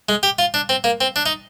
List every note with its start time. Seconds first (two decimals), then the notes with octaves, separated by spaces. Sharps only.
0.09 G#3
0.23 G4
0.39 F4
0.54 D4
0.69 C4
0.84 A#3
1.01 C4
1.16 D4
1.26 D#4